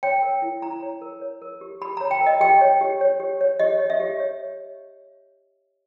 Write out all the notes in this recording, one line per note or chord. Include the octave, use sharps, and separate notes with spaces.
C#5 G5
A#4
E4
E4 A#5
C#5
A#4
C#5
A#4
G4
G4 B5
A#5
C#5
G5
A#4
D#5
G4 G5
C#5
G4
C#5
G4
C#5
G4 D#5
C#5
E5
G4
C#5